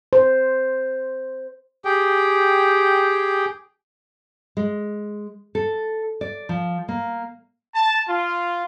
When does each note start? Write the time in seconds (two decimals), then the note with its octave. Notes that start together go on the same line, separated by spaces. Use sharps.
0.13 C5
1.85 G4 G#4 G5
4.57 G#3
5.55 A4
6.21 D5
6.49 F3
6.89 A#3
7.74 A5
8.09 F4